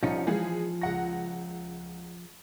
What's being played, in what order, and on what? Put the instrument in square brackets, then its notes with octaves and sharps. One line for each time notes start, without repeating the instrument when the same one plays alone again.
[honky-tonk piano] C2 C#7 [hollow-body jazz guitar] F3 C#4 D#4
[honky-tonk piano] E3 G#3 G#4 [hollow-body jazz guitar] F3
[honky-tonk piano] C#2 F#5 A#6